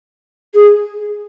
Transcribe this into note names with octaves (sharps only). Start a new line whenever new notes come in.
G#4